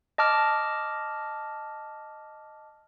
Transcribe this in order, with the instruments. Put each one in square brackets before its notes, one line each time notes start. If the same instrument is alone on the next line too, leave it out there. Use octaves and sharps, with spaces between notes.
[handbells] D#5 A5 D6 F6